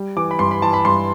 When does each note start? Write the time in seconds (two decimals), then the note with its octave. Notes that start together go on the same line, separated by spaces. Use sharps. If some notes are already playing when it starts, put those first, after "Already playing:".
Already playing: G3
0.16 E3 D6
0.31 B5
0.39 G2 C6
0.51 B5
0.62 E3 A5
0.73 B5
0.85 G2 C6